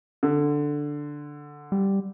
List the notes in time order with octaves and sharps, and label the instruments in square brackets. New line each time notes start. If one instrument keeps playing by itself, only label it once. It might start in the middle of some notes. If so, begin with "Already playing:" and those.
[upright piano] D3
[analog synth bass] G3